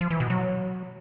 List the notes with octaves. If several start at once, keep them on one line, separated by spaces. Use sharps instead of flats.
F3
E3
B2
F#3